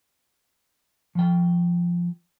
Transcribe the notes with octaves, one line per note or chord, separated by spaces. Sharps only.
F3 G5